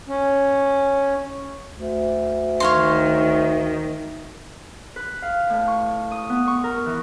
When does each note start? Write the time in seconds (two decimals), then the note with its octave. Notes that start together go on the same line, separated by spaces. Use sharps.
0.08 C#4
1.73 D2
2.60 D#3 C#5 F5 C6
4.96 B4
5.22 F5
5.50 A2
5.68 C#6
6.11 D#6
6.30 B3
6.48 C#6
6.64 A#4
6.86 E3